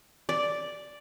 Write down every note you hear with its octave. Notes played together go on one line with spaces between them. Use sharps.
D5